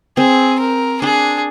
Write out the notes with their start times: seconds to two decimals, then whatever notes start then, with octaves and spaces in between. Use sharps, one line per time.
0.17 C4 G#4
0.60 A#4
1.01 D4 G#4